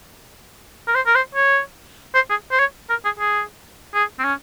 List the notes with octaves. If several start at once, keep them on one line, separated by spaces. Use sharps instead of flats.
A#4
C5
A#4
C5
C#5
C5
G#4
C5
C#5
A#4
G#4
G#4
G#4
C4
C#4